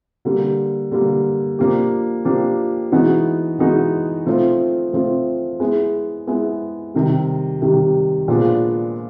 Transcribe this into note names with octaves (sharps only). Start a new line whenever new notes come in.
D3 G3 A#3
D3 G3 A#3
F3 A#3 D4 G4
F3 A#3 D4 G4
E3 G#3 B3 D#4 F#4
E3 G#3 B3 D#4 F#4
F3 A3 C4 F4
F3 A3 C4 F4
G#3 B3 E4 G#4
G#3 B3 E4 G#4
C3 D#3 G3
C3 D#3 G3
A#2 F3 G#3 B3 D4